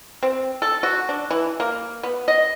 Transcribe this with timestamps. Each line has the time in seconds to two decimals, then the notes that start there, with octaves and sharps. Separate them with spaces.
0.23 C4
0.62 A4
0.83 F#4
1.09 D4
1.31 E3
1.60 A#3
2.03 B3
2.28 D#5